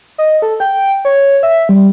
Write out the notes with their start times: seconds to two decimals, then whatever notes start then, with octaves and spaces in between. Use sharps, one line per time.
0.18 D#5
0.42 A4
0.60 G5
1.05 C#5
1.43 E5
1.69 G3